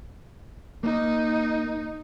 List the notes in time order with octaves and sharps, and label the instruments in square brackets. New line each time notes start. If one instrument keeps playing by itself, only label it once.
[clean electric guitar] A#3 [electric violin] D#4